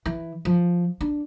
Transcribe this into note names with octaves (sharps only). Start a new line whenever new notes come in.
E3
F3
D4